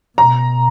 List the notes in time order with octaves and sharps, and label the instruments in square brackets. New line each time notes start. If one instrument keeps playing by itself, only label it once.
[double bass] B2 [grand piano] A#5